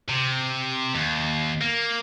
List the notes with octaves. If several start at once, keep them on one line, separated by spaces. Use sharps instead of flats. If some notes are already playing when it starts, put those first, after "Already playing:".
C3
D#2
A#3